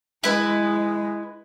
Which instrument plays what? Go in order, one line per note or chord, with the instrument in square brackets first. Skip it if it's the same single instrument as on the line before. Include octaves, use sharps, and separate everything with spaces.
[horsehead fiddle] G#3 [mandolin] E4 B4